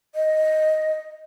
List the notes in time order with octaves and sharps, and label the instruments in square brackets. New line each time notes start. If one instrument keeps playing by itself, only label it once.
[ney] D#5